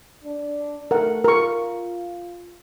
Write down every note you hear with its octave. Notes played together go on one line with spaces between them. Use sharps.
D4
A3 A#4 F#5
F4 A#4 C#6